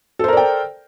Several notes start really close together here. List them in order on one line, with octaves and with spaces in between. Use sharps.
A4 C5 A#4 D5 G5